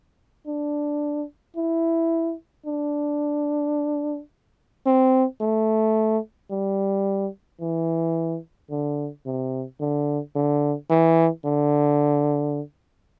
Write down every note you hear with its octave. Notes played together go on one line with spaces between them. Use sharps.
D4
E4
D4
C4
A3
G3
E3
D3
C3
D3
D3
E3
D3